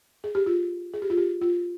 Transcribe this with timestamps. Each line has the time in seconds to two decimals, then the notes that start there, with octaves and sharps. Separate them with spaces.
0.24 G#4
0.35 G4
0.46 F4
0.94 G#4
1.02 G4
1.10 F4
1.17 G4
1.41 F4